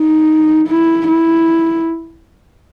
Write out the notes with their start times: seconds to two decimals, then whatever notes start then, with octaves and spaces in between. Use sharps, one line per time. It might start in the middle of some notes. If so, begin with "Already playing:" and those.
Already playing: D#4
0.68 E4
1.08 E4